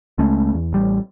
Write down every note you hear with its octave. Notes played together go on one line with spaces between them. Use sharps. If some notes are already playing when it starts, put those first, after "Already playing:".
C#2 G#3 A3 C#4
E2
A1 G3